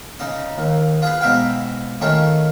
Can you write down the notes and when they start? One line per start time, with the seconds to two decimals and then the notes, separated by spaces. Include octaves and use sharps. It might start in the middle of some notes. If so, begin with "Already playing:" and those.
0.19 C#3 D#4 D#6
0.58 D#2
1.02 F4 G#4 B4
1.21 G#2 B2 E5 F5 G5
2.01 D#3 A3 C#4 F4